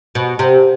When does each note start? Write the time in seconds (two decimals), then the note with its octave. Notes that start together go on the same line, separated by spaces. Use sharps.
0.15 B2
0.39 C3